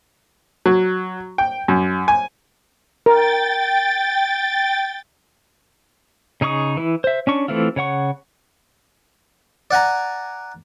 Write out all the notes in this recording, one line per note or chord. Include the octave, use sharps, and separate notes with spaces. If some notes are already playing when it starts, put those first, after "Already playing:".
F#3
G5
F#2
G#5
A#4 G5 A6
C#3 D#4 G#4 C#6 D#6
E3 E4
C5 E5
C#4 D4 C#6
E3 A3 C4 E4 F4
C#3 C#5 F#5 C#6
D5 F#5 G#5 A#5